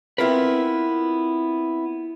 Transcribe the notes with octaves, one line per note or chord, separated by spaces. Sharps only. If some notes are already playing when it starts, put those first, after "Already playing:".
B3 C4 E4 F4 A#4 B4